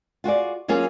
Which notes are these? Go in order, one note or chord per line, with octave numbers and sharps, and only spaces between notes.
F4 F#4 G#4 D5
F#3 A#3 C#4 F4 G#4